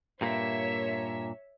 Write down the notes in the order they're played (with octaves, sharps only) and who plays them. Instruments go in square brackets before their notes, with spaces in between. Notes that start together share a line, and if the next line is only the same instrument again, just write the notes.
[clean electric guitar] G2 A#2 A#3 [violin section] C#5 E5